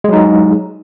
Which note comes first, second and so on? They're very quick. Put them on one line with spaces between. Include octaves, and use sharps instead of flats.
G#3 F#3 D#4 G#4